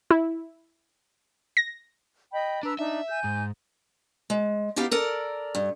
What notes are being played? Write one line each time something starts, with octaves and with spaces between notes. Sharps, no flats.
E4
A#6
D#5 G5 B5
D4 B4 A#5 E6
D4 D#4 E5
G#5 G6
G#2
G#3
B3 D#4 E4 G4 F5
A4 A#4 D5
G2